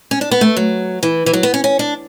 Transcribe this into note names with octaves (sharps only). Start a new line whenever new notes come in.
C#4
D4
B3
A3
F#3
E3
E3
F#3
B3
C#4
C#4
D4